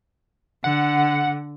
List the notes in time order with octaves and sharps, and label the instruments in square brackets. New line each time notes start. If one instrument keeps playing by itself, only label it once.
[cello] D3 [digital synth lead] F#5